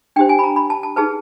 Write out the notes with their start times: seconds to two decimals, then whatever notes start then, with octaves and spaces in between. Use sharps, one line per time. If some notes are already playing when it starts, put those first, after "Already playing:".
0.16 D4 G4 C5 G5
0.29 G#5
0.39 B5
0.44 A#5
0.56 B5
0.70 A5
0.83 A5
0.96 D#4 G#4 B4 A5